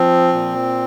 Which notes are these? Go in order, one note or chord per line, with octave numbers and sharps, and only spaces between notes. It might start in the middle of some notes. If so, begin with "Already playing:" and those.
Already playing: F3 C4
A#2